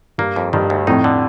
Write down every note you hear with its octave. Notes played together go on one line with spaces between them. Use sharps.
G2 A#3
F2
G2 D#3
D2
F2 A2 D#4
D3